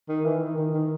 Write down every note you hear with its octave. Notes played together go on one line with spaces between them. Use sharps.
D#3
E3
D#3
D#3
D#3